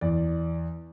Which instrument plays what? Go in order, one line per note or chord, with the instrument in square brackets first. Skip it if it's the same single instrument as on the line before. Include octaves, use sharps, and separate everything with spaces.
[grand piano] E2 D5